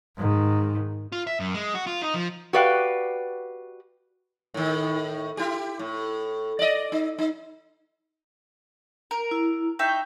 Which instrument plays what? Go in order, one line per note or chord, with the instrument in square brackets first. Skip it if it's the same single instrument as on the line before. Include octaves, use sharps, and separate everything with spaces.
[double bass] G#2 D#3
[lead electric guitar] F4
E5
F#2
G#3
F#4
F4
D#4
F3
[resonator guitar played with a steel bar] F#4 G4 B4 D5 F5 G5
[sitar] A2 D#3
E4 G4
A2
D5 D#5
D#4
D#4
[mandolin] A#4
[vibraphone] E4
[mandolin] D#4 E5 G5 [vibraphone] C#6